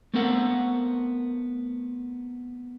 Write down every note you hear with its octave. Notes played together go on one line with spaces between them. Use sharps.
A3 B3 C4 A4 A#4 F#5